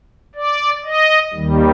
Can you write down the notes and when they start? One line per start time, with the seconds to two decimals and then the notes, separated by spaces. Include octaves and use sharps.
0.35 D5
0.85 D#5
1.34 D#2 D#3 G3